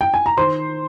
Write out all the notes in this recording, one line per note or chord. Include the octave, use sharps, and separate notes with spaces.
G5
G#5
A#5
D#3 C5 C6